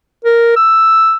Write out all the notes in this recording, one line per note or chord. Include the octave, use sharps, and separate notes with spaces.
A#4
E6